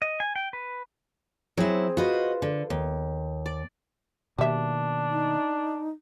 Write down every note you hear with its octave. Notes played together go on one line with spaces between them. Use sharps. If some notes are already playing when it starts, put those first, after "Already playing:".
D#5
G#5
G5
B4
F#3 C4 E4 G#4
F4 F#4 B4 C5 D#5
D3
D#2
D5
B2 D#3 G3 A#3 D4 E5
D#4